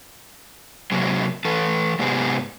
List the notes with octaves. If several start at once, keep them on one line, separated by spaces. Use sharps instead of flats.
C3 F#3 G#3 A#3
E3 A4 B4
G#2 C3 G#3 B3 G4 G#4